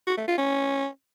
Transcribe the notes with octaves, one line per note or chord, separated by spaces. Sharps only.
F#4
A3
F4
C#4